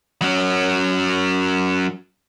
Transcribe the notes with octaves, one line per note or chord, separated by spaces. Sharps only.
F#3 C#4